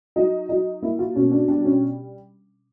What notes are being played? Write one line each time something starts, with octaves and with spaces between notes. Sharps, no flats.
F#3 D#4
F#3 D#4
A#3 E4
F4
B2 C#4
D4
G3 D4
C#4